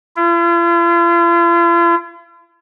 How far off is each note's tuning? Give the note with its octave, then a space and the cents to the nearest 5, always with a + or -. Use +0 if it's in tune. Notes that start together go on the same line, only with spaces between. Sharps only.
F4 -45